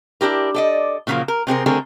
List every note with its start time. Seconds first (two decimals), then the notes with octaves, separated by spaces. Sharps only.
0.21 D4 E4 G4 A#4
0.54 A4 D5 D#5
1.07 A#2 C#3 F3 F#3 A#3
1.28 A#4
1.47 C3 C4 G#4 A#4
1.66 D3 G3 A3 C4 G#4 A#4